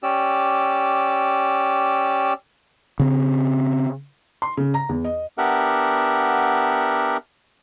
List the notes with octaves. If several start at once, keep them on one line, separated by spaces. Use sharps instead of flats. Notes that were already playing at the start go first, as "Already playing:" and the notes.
C#4 G4 D5 E6
C#3 C4
C6
C#3
A#5
E2
D#5
B3 D4 G4 A#4 E5 F#5